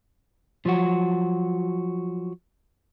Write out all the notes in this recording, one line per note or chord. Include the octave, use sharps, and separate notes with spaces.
F3 F#3 F#4